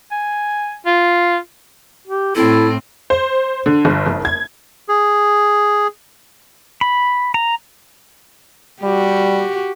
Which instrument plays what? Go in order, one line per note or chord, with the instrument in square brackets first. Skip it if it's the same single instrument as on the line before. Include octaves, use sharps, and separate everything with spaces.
[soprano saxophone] G#5
F4
[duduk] G4
[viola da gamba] A2 C4 [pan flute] E4 [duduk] A4
[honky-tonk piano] C5
D3
G1
F#1
G#6
[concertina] G#4
[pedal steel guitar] B5
A#5
[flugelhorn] G3 [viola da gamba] F#4 G4